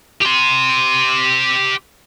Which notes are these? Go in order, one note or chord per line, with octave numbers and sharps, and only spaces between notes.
G4 C6